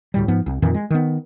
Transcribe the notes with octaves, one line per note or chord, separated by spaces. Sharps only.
D2 A2 G3
G#2 F3 B3
C2
F2 A#2 D#3 E3
G#3
D#3 B3